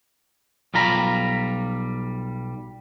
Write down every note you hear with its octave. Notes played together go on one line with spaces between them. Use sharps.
B1 G3 F4 A#5 B5